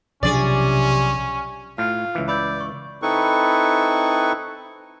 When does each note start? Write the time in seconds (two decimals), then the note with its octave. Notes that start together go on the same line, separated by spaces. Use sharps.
0.23 B1 C3 F3 C#4 D4 G#4 D5
1.78 A2 F4 F6
2.15 C#2 E3
2.28 D5 B5 E6 G6
2.60 C#6
3.02 C4 D#4 E4 A4 B4 C#6